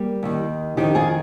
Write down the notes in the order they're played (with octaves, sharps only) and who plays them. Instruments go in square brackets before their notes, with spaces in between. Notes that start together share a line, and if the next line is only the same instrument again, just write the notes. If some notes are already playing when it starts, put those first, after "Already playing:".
Already playing: [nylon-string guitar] G3 A#3
D#2 D#3
F2 D#3 D#4 G4
F4 G#4